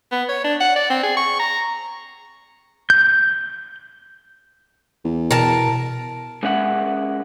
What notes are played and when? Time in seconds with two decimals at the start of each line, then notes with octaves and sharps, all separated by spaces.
0.12 B3
0.29 C#5
0.44 D4
0.60 F#5
0.76 D5
0.90 C4
1.03 G#4
1.17 C#6
1.40 A#5
2.90 G6
5.05 E2
5.31 B2 A#4 A5
6.43 G#3 C#4 A#4 E5 F#5